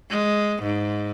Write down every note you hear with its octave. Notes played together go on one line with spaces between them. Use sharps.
G#3
G#2